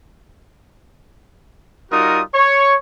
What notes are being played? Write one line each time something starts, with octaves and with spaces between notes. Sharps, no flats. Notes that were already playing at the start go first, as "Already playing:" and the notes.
G3 D#4 F4 F#4 A#4 D#6
C#5 C#6